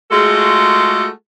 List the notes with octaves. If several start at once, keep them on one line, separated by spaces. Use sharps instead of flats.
G#3 A3 F4 F#4 G#4 A4